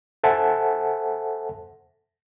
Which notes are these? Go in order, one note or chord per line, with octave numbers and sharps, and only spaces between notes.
A4 C5 E5 F#5 G#5 A5